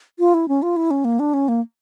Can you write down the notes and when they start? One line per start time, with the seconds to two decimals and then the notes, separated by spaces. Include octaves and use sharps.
0.19 F4
0.34 E4
0.48 C#4
0.62 F4
0.76 E4
0.91 C#4
1.05 A#3
1.19 D4
1.34 C#4
1.48 A#3